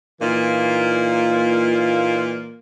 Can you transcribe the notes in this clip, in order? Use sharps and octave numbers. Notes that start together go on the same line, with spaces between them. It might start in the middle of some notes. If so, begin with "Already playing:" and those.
A#2 E3 A#3 D#4 F4